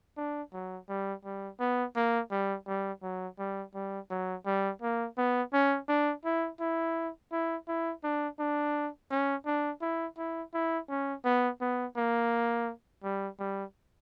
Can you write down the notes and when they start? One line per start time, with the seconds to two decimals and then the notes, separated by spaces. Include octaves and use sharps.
0.17 D4
0.53 F#3
0.89 G3
1.25 G3
1.60 B3
1.96 A#3
2.31 G3
2.67 G3
3.03 F#3
3.39 G3
3.75 G3
4.10 F#3
4.46 G3
4.82 A#3
5.17 B3
5.53 C#4
5.89 D4
6.25 E4
6.60 E4
7.32 E4
7.68 E4
8.04 D4
8.39 D4
9.11 C#4
9.46 D4
9.82 E4
10.18 E4
10.54 E4
10.89 C#4
11.25 B3
11.61 B3
11.97 A#3
13.03 G3
13.39 G3